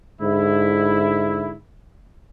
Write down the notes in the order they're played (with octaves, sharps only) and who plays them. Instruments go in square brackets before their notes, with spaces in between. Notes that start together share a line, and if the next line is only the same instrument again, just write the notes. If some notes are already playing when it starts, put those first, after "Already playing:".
[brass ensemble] G#2 D3 E4